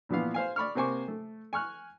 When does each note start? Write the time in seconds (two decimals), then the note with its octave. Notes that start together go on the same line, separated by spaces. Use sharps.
0.09 A#2 E3 F3 B3 F5
0.34 C5 F5 G#5
0.56 D5 B5 C#6 F6
0.75 C3 A#3 C5 G#5 C#6 D6
1.08 A3
1.53 G#5 C#6 F6 F#6